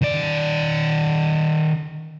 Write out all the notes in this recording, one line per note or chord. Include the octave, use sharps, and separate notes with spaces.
D#3 D5